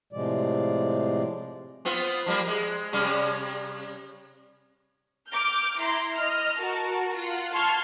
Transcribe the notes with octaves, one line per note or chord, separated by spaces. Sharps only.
A2 C3 F3 G#3 D5
B3 C4 F4
F3 G3 A#3
G#3
C3 G3 C#4
D6 F6 G6
E4 A#5 C6
D#5 F6
F#4 A#4 A5
F4 F#5
A5 C6 C#6 F6 G#6